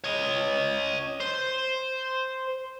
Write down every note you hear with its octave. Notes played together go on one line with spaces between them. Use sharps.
C#5 D#5
C5